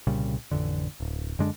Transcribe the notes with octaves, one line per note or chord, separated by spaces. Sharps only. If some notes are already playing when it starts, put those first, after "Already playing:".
C2 A#2 C#3 G3
A1 F2 D3
D1
F#2 D3 G#3 D4